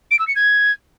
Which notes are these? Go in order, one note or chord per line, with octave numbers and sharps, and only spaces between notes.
D7
E6
C#7
G#6